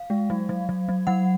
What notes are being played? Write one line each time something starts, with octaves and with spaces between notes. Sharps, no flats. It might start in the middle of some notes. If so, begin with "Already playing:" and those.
Already playing: F5
G#3
F#3
F#3
F#3
F#3
F#3 F#5